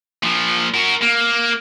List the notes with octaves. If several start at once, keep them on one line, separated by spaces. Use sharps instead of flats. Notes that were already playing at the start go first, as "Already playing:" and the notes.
A#2 F3
F#4 A#4
A#3